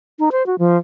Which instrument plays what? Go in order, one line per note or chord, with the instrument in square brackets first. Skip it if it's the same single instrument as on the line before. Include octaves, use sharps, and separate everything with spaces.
[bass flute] D#4
C5
F#4
F3